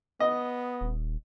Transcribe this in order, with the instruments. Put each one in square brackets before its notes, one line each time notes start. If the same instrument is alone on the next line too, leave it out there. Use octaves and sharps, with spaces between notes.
[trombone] B3 [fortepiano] D#5
[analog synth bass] D#1